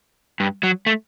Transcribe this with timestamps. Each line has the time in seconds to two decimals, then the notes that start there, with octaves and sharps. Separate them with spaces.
0.40 G2
0.63 F#3
0.86 A3